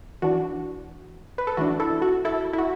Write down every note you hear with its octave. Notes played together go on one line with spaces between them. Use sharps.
E3 D4 F#4
B4
A4
E3 A3 D4 F#4
E4 A4
F#4
E4 A4
E4
F#4